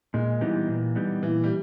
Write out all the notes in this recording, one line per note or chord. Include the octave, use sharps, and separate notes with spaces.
A#2 G#3
E3 G3 B3 D#4 G4
A#2
G3 B3 D#4 G4
A#2 E3
G3